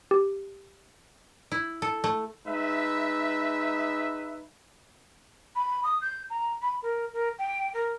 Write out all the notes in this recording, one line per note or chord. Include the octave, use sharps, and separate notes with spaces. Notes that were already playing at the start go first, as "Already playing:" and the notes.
G4
E4
A4
A3
G#3 D#4 B4 E5
B5
D#6
G6
A#5
B5
A#4
A#4
G5
A#4